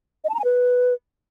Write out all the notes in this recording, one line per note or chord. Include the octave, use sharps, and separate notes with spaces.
D#5
A5
A#5
G#5
B4